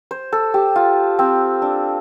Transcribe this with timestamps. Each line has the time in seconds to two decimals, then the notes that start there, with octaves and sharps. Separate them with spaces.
0.11 C5
0.32 A4
0.54 G4
0.76 F4
1.19 C4
1.62 D4